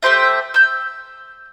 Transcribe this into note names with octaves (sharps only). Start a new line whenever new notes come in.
A3 G4 C5 E5
E6 G6